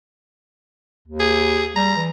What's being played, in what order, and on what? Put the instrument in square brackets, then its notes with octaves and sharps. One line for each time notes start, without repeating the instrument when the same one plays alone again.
[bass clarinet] D#2
[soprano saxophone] G#4
[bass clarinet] G3 [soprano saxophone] A#5
[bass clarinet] E3